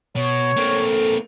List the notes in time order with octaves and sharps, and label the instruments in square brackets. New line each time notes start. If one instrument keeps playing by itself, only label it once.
[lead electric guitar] B2 [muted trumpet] C#5
[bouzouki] A2 A3 [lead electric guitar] A#3 C4